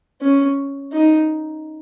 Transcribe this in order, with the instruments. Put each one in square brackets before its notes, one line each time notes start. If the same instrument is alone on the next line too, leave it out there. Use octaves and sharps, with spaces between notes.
[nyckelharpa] C#4
D#4